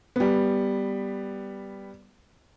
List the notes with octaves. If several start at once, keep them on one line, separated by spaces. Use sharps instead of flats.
G3 B3